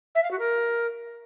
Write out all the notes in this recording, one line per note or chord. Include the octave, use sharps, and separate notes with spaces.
E5
F5
F#4
A#4